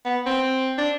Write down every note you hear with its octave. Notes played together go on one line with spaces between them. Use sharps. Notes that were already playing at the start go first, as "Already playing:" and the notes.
B3
C4
D4